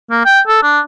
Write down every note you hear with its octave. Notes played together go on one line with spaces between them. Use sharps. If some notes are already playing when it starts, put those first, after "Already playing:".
A#3
G5
A4
D4